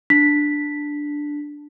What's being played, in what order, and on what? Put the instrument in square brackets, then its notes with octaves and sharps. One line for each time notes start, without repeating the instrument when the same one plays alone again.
[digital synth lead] D4 [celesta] B6